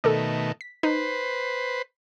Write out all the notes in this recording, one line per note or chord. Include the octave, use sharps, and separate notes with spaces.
B2 D#3 A3 A4 A#4 D5
B6
D#4 B4 C5